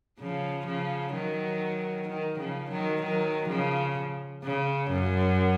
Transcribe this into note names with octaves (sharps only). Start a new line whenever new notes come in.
C#3 F3
C#3 F3
D#3 F#3
D#3
C#3 F3
D#3 F#3
D#3 F#3
C#3 F3
C#3
F#2